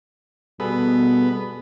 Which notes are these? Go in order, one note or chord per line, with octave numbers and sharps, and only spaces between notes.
B2 G3 B3 G#4 A4